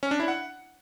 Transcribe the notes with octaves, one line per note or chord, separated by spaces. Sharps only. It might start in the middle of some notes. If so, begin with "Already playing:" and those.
C#4
D4
E4
F#5